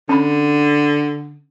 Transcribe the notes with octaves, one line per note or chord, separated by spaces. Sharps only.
D3 C#4 B5